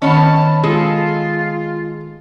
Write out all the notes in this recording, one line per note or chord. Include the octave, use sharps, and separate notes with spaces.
D#3 B3 C#4 B4 C#5 A5
G#3 F4 G#4 A4